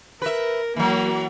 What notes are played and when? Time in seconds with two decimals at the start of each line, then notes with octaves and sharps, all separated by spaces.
0.22 A#4 B4 E5
0.76 E3 F#3 A#3